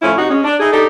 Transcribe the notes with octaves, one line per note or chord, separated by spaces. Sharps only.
A2 F3 C#4 E4
C3 D#4 F#4
G#3 C#4
D4
D#4 E4 G#4
D4 D#4 G4 A4